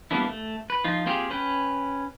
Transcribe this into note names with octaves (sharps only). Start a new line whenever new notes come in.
G3 A#3 B3 D4 E4
A3
B4
F3 D#4 F4
A#3 C4 F4 G4 G#4
C#4 B4 G5